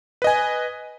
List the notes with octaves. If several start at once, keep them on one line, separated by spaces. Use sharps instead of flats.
B4 D#5 G#5